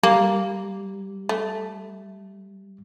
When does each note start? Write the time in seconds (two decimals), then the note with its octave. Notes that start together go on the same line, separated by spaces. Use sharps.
0.03 G3 A#3
1.29 A3